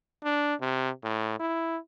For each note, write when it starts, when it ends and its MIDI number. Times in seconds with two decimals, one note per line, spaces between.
0.24 0.55 62
0.61 0.90 48
1.03 1.38 45
1.40 1.77 64